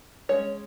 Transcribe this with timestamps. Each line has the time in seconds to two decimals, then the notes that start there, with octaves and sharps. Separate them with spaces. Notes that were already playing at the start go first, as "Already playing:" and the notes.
0.29 G#3 C#4 C#5